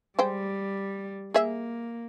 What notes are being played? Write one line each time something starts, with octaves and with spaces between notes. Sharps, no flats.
G3 G#3 C5 G5
A#3 G#4 E5